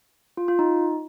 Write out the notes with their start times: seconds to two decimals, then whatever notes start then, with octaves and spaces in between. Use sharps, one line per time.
0.37 F4
0.48 F4
0.59 D#4